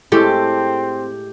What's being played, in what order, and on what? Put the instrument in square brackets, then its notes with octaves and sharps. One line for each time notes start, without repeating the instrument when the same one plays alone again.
[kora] A2 G#3 [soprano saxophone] C4 [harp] G4 [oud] A4